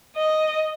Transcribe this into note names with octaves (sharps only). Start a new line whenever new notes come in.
D#5